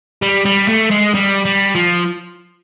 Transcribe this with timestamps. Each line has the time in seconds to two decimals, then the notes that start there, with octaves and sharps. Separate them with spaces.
0.22 G3
0.45 G3
0.69 A3
0.91 G#3
1.15 G3
1.45 G3
1.75 F3